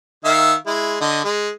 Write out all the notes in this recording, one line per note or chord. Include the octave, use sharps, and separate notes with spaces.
D#3 E5 F5
G#3 E4
D3 D#5
G#3